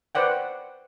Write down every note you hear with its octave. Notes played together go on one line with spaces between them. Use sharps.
B4 C5 D5 F#5 G5